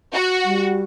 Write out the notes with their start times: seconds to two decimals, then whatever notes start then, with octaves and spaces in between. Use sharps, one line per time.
0.13 F#4
0.45 G3